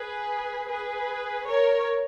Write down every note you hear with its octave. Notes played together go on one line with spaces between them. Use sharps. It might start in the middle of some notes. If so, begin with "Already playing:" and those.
Already playing: G#4 B4
G#4 B4
A#4 C#5